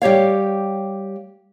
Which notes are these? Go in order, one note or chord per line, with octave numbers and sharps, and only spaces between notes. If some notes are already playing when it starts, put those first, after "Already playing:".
G3 G4 C#5 F5